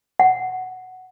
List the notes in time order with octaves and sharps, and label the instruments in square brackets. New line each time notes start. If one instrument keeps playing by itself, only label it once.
[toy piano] F#5